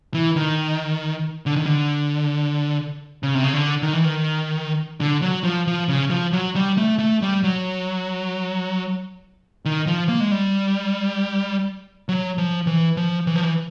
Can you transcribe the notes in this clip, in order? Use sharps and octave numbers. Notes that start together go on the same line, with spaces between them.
E3
D#3
D3
D#3
D3
C#3
C3
C#3
D3
D#3
E3
D#3
D3
F#3
F3
F3
C#3
F3
F#3
G3
A3
A3
G3
F#3
D#3
F3
A#3
G#3
G3
F#3
F3
E3
F3
E3
F3
E3